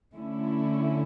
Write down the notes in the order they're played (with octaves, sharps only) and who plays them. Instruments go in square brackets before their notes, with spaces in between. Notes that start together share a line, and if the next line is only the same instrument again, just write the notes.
[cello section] D3 A3 C#4 E4